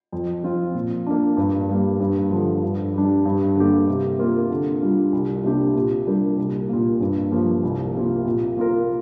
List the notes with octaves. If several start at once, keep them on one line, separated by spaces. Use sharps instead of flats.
F2
F3 C4 F4
A#2
A#3 D4
G2
G3 A#3
G2
D3 F3
G2
G3 D4
G2
D3 G3 A#3 G4
C3
A#3 F4 A#4
D3
G3 D4 F4
C2
C3 A#3 D4 G4
A#2
G3 D4 G4 A#4
C2
A#2 A#3
G2
F3 A#3
C2
C3 A#3 F4
A#2
A#3 F4 A#4